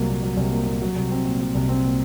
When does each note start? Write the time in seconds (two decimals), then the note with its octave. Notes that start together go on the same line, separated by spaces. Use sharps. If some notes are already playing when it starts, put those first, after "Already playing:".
Already playing: C2 F#3 A#3
0.08 A#2
0.23 F#3
0.37 C2
0.52 A#3
0.67 A#2
0.82 F#3
0.96 C2
1.11 C4
1.25 A#2
1.40 F#3
1.55 C2
1.69 C4
1.84 A#2